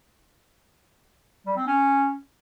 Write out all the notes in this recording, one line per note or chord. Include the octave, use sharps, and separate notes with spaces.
G3
C4
C#4